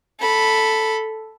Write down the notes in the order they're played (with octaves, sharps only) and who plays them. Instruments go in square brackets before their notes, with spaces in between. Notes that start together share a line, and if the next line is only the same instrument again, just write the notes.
[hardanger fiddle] A4 B5